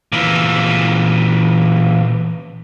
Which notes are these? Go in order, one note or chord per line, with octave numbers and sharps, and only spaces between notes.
A#2 E3